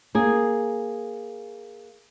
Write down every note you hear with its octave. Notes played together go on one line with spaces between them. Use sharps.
A#3 G#4